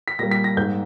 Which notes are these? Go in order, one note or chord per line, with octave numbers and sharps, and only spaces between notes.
B6
A#2 G3 A#3 A#6
B6
A#6
G#2 G3 A#3 G6